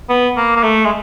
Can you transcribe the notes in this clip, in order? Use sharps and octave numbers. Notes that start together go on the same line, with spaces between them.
B3
A#3
A#3
A3
G#3